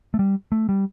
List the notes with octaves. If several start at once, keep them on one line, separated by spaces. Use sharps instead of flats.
A3
G3
A3
G3